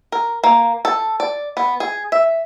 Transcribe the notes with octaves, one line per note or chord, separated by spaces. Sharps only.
A#4
A#3
A4
D5
B3
G#4
E5